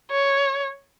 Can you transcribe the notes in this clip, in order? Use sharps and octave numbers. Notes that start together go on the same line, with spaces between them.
C#5